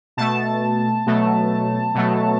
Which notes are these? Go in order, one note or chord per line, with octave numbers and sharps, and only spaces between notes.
B2 A3 A5
B2 F#3 A3
B2 F#3 A3